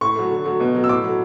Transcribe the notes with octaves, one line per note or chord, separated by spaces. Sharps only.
A2 C#6
F#3 A3
D3
F#3 A3
B2
F#3 A3
E6
A2 D6
F#3 A3